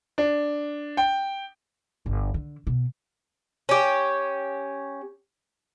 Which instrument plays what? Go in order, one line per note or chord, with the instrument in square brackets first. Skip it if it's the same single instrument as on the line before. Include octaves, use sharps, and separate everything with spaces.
[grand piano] D4
G5
[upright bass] G1
D3
B2
[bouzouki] C#4 G4